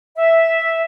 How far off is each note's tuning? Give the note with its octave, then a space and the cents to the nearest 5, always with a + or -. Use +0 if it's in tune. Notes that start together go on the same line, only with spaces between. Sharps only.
E5 -5